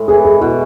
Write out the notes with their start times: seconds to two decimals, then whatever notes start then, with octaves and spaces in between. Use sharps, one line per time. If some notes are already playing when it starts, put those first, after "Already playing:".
Already playing: A2 G#3
0.08 E3 G#4
0.25 G#4
0.41 B2 E4